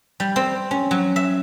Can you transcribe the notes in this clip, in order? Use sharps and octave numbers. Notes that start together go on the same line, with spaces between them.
G3
C4
C#4
F#3
E5